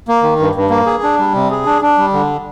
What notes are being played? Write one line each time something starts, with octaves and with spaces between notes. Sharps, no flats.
A#3
D#3
G2
G2
A#3
G#4
D4
G3
C3
G#4
D4
D4
G3
D3